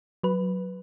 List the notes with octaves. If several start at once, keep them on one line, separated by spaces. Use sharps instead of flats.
F#3 B4